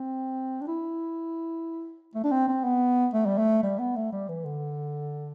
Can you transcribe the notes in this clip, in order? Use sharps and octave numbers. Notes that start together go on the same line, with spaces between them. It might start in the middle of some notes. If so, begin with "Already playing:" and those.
Already playing: C4
D4
E4
A3
D4
C4
C4
B3
A3
G3
A3
G3
B3
A3
G3
E3
D3